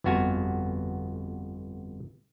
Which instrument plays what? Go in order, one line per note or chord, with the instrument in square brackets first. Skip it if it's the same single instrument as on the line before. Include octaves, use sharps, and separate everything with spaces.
[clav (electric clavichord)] G1 F2 B3 F#4 F5 G#5